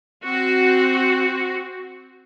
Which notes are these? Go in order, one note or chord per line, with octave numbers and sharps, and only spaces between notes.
C4 F#4